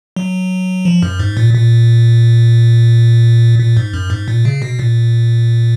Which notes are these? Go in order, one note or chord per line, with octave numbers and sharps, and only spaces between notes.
F#3
F3
F#2
G#2
A#2
A#2
A#2
G#2
F#2
G#2
A#2
C#3
B2
A#2